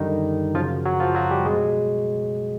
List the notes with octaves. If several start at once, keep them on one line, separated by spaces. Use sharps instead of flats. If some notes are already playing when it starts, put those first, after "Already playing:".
Already playing: F#2 D3 D#3 G3 D#4
F#2 C#3 F3 F#3 F4
F#3 F#4
F3 F4
F#3 F#4
G3 G4
B2 F#3 G#3 G#4